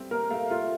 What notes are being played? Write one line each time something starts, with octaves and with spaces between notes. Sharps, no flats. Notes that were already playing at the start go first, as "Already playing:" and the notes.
Already playing: G3 A3 C4
A#3 A#4
A3 F5
A3 F4